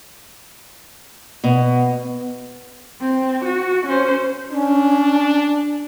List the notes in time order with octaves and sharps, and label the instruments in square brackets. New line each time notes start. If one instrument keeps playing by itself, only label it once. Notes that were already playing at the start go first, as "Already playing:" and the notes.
[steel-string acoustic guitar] B2
[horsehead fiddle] C4
F#4
C#4 C5
[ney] C#4 [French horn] D4